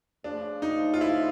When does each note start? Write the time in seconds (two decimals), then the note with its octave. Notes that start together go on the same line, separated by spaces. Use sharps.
0.24 C#3 F3 A3 D4
0.62 D#4
0.94 F4
1.01 E4